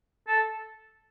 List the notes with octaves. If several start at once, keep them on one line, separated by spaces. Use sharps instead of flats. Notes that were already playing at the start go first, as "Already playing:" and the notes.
A4